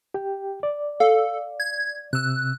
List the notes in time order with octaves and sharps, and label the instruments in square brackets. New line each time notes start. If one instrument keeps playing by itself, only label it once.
[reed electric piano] G4 G5
D5
[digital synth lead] A4 [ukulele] F5
[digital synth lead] G#6
[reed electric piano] C3 E6 [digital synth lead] F#6